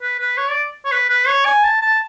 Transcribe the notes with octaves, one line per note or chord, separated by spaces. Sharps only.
B4
B4
C#5
D5
C#5
B4
B4
C#5
G#5
A5
A5